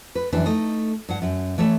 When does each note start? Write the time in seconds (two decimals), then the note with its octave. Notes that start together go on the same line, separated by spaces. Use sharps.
0.15 B4
0.32 F#2 E3 G3 D4 B4 D5
0.46 A3 D#4 D#5
1.09 G2 F#5
1.22 F#2
1.58 E3 A3 C#5 E5